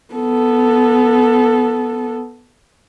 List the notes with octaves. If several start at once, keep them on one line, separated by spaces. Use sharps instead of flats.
B3 A4